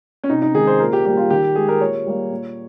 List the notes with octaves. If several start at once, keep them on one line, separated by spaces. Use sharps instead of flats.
C#4
C3 D#4
D#4
D#3 G#3 G#4
C5
A#2 A#4
G4
G3 A#3 G4
F4
D#3 G4
G#3 G#4
A#4
A#2 C#5
G3 A#3
A#2